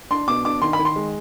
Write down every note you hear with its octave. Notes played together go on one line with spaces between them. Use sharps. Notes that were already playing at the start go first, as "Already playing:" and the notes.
D4 C6
B2 D6
D4 D6
D#3 C6
B5
D#3
C6
G#3